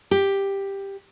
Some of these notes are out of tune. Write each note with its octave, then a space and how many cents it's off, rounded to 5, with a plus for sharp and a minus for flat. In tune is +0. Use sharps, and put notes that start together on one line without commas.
G4 +5